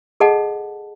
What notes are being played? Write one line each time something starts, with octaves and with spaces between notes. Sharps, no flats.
G#4 A4 D#5 F#5 A5